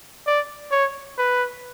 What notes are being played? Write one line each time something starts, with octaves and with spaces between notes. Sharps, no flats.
D5
C#5
B4